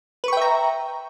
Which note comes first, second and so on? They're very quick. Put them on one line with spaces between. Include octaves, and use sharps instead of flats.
B4 C#6 G5 E5 A#5